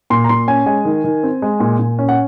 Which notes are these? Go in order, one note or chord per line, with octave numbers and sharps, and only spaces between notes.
A#2 C6
A#5
A#2 C6
C#4 G#5
G#3 G#5
D#3
D#3
C4
G#3
A#2
A#2
C#4
F#5